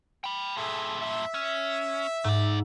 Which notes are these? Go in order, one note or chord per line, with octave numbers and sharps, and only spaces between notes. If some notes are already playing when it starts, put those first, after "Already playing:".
G5 B5
G2 A#2 G#4 A4 E5
E5
C#4
G#2 A3 D5